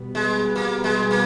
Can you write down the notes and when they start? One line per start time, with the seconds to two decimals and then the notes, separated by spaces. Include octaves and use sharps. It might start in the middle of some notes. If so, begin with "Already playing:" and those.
Already playing: B2 G3 B3
0.15 G#3
0.56 A#3
0.84 G#3
1.11 A#3